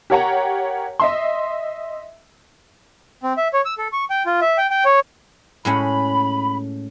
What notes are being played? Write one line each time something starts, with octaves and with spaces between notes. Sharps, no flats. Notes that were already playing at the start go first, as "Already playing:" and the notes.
G4 A#4 C#5 F#5 G5 A#5
D#5 E5 C6
C4
E5
C#5
E6
A4
C#6
G5
F4
E5
G5
G5
C#5
A2 G#3 C#4 B5